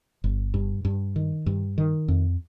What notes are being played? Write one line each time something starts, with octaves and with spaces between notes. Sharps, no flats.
G1
G2
G2
D#3
G2
D#3
F2